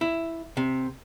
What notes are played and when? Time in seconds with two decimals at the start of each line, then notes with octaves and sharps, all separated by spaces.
0.01 E4
0.57 C3